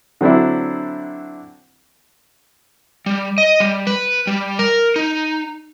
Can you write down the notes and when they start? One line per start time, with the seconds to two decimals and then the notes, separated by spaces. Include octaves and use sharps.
0.21 D3 F#3 C4 D4 E4
3.06 G3
3.38 D#5
3.60 G3
3.87 B4
4.27 G3
4.59 A#4
4.96 D#4